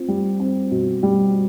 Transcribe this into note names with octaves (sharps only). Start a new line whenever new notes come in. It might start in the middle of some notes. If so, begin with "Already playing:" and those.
Already playing: C4 F4
G3
C4
B2
G3